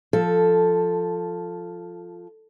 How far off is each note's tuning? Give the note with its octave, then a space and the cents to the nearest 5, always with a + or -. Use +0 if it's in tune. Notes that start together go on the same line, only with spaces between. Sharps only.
F3 +0 A4 +0